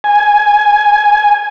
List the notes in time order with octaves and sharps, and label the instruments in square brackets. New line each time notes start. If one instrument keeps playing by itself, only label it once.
[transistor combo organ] G#5